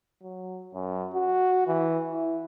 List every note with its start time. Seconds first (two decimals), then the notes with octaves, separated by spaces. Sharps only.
0.23 F#3
0.75 F#2
1.14 F#4
1.67 E3
2.13 E4